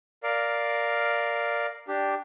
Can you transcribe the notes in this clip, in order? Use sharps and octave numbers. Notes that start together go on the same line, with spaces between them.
A#4 D5 F5
D4 G4